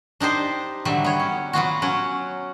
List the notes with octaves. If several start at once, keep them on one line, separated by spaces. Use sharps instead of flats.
D4 D#4 G4 C5 D#5
D3 F#3 G3 D#5 E5
B3 C#5
C#4
F#3 B3 F4 F#4
F#3 C#4 F#5